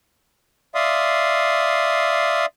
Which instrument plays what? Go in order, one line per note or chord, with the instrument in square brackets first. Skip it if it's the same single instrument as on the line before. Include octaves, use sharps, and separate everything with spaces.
[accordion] D5 E5 F5 C6 D#6